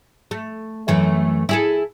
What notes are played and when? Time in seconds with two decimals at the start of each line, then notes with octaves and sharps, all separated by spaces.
0.31 A3
0.88 F#2 E3 A3
1.49 E4 G#4 A4